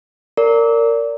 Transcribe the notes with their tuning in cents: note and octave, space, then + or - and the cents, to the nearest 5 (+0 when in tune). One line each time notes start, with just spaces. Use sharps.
A#4 -20 D5 -25